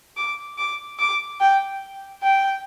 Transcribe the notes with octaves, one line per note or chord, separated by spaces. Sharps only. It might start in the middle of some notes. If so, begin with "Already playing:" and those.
D6
D6
D6
G5
G5